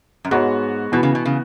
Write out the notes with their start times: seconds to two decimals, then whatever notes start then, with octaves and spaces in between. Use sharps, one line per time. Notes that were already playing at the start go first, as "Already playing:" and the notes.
0.25 F#2
0.31 G#2 G#3 B3 F#4 C#5
0.92 B2 E3 B3 F#4 B4
1.03 C#3
1.15 B2
1.25 C#3